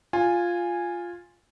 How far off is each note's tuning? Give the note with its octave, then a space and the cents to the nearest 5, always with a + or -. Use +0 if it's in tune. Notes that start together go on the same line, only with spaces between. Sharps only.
F4 +0 G#5 -10